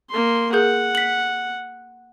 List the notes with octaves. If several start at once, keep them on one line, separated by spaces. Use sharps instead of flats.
A#3 C6
G#4 A#4 F#5 G6
B6 F#7